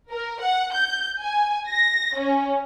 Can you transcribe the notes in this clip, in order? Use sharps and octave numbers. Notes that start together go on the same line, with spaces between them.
A#4
F#5
G6
G#5
A#6
C#4